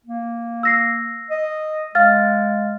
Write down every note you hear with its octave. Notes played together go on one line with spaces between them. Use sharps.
A#3
E6 A#6 C7
D#5
G#3 F5 F6 A6